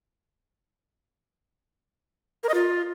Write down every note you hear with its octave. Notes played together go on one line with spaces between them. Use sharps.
A#4
D#5
F4